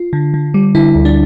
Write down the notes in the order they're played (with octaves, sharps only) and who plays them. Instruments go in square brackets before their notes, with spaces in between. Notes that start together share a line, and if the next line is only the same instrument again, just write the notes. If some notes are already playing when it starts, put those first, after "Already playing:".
Already playing: [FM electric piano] F4
D3
D3
G3
D3 E4
D2
D4